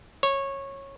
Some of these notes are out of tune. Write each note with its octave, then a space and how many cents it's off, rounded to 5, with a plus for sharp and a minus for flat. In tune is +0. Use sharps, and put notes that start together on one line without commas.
C#5 -15